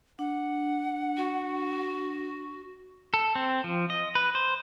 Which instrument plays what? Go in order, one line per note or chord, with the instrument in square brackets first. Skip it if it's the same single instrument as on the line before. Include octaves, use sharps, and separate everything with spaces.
[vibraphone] D4 [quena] F#5
[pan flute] F#4
[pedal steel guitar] A4
C4
F3
D#5
B4
C5